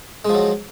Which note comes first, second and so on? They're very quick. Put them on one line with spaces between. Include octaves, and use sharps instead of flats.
G#3 F3 F#3